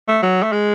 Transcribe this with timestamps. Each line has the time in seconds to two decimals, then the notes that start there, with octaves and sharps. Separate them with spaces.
0.08 A3
0.23 F#3
0.43 A3
0.52 G#3